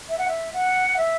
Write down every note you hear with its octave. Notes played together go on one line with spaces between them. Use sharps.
E5
F#5
E5
F#5
E5